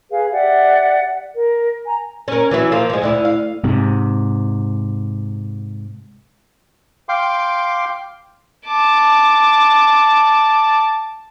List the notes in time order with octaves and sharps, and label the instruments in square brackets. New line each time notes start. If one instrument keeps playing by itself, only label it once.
[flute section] G#4 B4 F5
G4 D5 E5 F#5
A#4
G#5 A#5
[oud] C#4 A#4
E3 F#3 E4
F3 A#3 F4
F3 G#3
D2 D3 E4
F5
[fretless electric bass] G#2 C3
[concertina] F5 G5 C6 D6
[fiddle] A5 D6